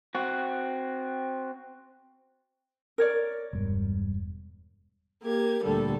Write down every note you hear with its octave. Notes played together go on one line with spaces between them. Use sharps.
C4 F#4
A#4 C#5 D5
E1 G2
A#3 G4 G#6
D2 A#2 D3 G3 A4